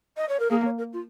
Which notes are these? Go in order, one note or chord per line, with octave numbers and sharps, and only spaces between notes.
D#5
C#5
A#4
A#3 G#4
C#5
A#4
F4